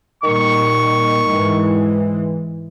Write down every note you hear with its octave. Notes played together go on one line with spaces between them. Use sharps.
A#2 D#3 G3 C#6
G#2 E3 G#3